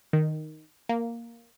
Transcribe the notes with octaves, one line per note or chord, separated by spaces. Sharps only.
D#3
A#3